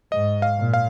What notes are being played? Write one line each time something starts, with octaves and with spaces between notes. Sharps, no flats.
G#2 D#5
F5
A#2
F5